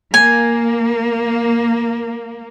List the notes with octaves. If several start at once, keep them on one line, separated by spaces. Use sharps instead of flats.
A#3 G#5